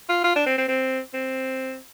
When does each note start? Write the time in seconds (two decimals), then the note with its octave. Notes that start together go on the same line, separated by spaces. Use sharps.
0.09 F4
0.24 F4
0.35 D4
0.46 C4
0.58 C4
0.68 C4
1.14 C4